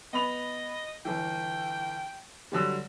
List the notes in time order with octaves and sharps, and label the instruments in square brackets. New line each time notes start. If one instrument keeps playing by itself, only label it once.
[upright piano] B3 B5 F7 [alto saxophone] D#5
[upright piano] G1 E3 [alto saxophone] G5
[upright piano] D3 F#3 G3